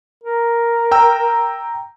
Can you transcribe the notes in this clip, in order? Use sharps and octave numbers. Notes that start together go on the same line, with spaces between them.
A#4
G5 A#5 E6